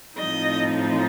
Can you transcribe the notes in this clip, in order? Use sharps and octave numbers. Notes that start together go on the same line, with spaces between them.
A2 F3 C4 D#4 D#5